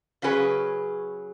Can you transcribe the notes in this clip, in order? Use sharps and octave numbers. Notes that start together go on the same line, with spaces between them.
C#3 F#3 C#4 G#4 B4